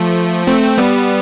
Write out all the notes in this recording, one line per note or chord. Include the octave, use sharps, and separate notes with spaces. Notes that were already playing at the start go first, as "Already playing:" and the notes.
Already playing: F3 A3
A3 C4
G3 B3